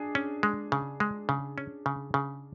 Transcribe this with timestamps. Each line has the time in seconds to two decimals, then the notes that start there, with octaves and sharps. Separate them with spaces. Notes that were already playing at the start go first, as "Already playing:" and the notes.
Already playing: D4 G#4
0.15 C#4
0.43 G#3
0.72 C#3
1.00 G#3
1.29 C#3
1.58 C#4
1.86 C#3
2.14 C#3